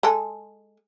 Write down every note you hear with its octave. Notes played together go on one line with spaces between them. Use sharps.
G#3 G#4 A4